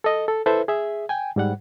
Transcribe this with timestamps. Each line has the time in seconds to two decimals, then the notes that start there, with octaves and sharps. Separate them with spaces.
0.04 A4 D#5
0.28 A4
0.46 E4 A4 B4 C5 E5
0.68 G#4 E5
1.09 G5 G#5
1.36 G#2 G3 F#5